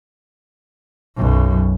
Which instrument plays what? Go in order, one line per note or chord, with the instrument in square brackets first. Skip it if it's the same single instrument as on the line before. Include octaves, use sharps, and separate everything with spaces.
[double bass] B1 F#2